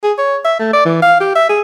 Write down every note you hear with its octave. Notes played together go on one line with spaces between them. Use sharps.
G#4
C#5
E5
A3
D5
E3
F5
G4
E5
G#4